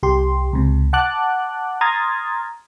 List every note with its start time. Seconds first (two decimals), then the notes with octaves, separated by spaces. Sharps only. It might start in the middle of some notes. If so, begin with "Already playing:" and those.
0.03 C2 G4 C6
0.53 C#2 C3
0.93 F#5 A5 D6 F#6
1.81 A#5 C6 D#6 F6 G#6 A6